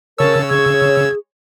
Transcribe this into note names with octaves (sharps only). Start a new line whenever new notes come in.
C#3 A#4 C#5 A5 E6
G#4 G#6